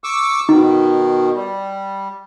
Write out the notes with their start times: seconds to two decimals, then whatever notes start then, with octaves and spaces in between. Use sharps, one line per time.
0.04 C#6 D6 E6
0.49 B2 D#3 D#4
1.35 G3